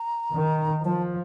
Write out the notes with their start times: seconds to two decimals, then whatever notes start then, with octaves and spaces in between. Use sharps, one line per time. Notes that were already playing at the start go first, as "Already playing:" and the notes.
Already playing: A#5
0.35 D#3
0.84 F3 A5